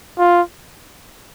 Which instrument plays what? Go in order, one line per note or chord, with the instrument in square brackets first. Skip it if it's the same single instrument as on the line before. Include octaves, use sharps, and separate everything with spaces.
[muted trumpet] F4